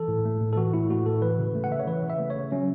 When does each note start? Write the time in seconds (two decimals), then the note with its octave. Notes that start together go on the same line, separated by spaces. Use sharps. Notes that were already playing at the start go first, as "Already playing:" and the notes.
Already playing: E3 A4
0.08 A2
0.25 A3
0.41 A2
0.53 A4
0.57 E3 F#4
0.74 A2 E4
0.90 A3 F#4
1.06 A2 A4
1.22 E3 B4
1.39 C#3
1.55 A3
1.64 F#5
1.72 C#3 E5
1.80 C#5
1.87 E3 B4
2.04 C#3
2.10 E5
2.19 A3
2.30 C#5
2.36 C#3
2.52 F#3 C#4